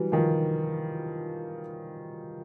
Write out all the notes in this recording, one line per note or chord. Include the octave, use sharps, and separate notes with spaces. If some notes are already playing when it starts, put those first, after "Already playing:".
Already playing: E3 F#3 G3
D#3 F3